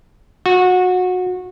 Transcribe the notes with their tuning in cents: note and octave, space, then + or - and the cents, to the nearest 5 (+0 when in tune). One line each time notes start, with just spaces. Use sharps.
F#4 -20